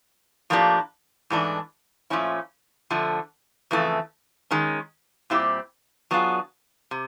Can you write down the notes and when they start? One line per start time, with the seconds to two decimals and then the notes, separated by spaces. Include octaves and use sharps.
0.50 A2 F3 A#3 D4 G4
1.30 G#2 E3 A3 D4
2.10 A#2 F3 A3 C#4 E4
2.90 D3 F3 A3
3.71 F2 C#3 E3 A3
4.51 D#3 G#3 C#4
5.30 A#2 G3 C4 E4 G4
6.11 F#3 B3 D4 F4 G#4
6.91 C3